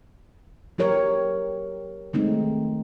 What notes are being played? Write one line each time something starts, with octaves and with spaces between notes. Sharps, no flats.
F#3 G4 A#4 C#5
D#3 F#3 G#3 A3 C4 D#4